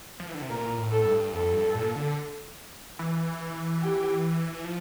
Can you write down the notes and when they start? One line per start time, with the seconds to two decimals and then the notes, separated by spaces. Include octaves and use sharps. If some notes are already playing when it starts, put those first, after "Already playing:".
0.20 F3
0.28 E3
0.34 D3
0.42 C3
0.50 A#2 A#4
0.78 A2
0.91 A4
1.05 G2
1.33 F2 A4
1.53 G2
1.74 A#2
1.96 D3
2.99 E3
3.82 G4
4.54 E3
4.65 F3